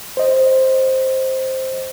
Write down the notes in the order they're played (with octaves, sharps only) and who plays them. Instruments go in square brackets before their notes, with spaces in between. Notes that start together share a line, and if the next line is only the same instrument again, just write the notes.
[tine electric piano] C5 D#5